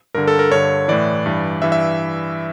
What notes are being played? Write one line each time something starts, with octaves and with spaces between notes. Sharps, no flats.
G2 D3 A#4
A4
A#4
G2 D3 C#5
A2 E3 D5
G2 E3
G2 E3 E5
E5